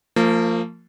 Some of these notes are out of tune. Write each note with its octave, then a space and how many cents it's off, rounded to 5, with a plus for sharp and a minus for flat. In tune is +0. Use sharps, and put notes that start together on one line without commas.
F3 -5 A#3 -35